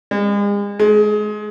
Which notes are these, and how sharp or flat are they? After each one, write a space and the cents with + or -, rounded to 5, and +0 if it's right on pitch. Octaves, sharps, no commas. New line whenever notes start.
G#3 -40
G#3 +25